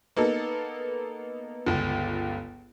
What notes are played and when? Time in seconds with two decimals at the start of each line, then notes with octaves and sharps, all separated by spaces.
0.16 A#3 B3 D#4 A4
1.67 G1 C#2